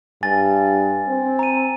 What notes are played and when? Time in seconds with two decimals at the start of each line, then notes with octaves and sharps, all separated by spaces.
0.23 G2 G#5 A6
1.08 C4
1.39 A#5 D#7